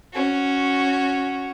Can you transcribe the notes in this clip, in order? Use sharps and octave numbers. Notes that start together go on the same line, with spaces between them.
C#4 F#4